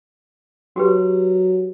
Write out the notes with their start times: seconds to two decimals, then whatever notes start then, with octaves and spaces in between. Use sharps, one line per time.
0.76 F#3 F#4 G4 B4